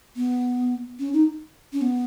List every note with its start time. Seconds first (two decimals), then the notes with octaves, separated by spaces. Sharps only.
0.16 B3
0.99 C#4
1.13 D#4
1.72 C#4
1.81 B3